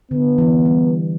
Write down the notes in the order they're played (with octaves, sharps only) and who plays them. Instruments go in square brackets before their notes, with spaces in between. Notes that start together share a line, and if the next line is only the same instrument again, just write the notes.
[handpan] D3 [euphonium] B3
[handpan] E3
G3